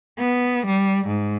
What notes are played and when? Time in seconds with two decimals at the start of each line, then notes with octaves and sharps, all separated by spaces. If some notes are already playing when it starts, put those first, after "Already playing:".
0.19 B3
0.66 G3
1.07 G#2